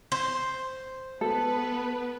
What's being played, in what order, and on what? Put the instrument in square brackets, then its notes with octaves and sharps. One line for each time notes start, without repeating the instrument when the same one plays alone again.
[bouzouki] C5
[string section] B3 B4 [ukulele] A4